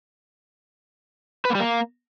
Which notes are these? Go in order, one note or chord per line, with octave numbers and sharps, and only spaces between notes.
B4
A#3
G3
A#3